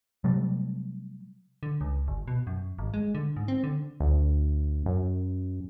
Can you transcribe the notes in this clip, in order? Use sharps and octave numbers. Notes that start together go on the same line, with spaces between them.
C3 F#3 G3 A3
D3
C#2
G1
B2
F#2
G#1
G#3
D3
G#2
C4
D3
D2
F#2